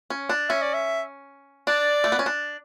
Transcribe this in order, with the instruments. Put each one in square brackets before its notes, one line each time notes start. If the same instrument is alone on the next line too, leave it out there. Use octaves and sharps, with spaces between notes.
[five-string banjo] C#4
D4
[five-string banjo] C#4 [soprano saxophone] E5
[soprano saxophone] D5
E5
[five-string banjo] D4 [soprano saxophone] D5
[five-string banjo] A3
B3
C#4
D4